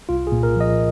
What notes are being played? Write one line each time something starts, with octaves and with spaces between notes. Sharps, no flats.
C2 F4
G#4
A#2
A#4
F3 D#5